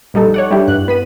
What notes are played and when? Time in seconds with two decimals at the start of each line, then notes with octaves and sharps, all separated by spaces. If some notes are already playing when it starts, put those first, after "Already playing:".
0.14 A#1 G3 D#4 A4
0.34 C#5 D5 F#5
0.51 G3 D4 E4 G4
0.68 G2 F#6
0.88 B3 B6 D#7